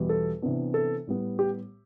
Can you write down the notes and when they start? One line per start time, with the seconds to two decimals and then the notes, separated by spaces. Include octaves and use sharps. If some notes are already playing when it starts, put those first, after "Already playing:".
Already playing: E2 B2 G3
0.09 A4
0.42 C3 E3 B3 D4
0.74 A4
1.07 A2 G3 B3
1.39 G4